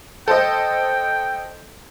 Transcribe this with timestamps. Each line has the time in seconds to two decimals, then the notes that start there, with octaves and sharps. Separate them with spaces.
0.28 A4 C5 D#5 G5